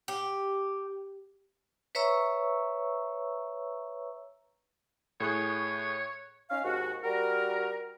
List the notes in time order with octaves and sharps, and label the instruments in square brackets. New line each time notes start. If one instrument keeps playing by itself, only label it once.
[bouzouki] G4
[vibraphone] B4 C#5 E5 A#5 C#6 E6
[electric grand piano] A2 G#4 F#6 [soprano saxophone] C#5
[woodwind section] C#4 D#4 F5
D#2 G#2 F#4
G3 F#4 A#4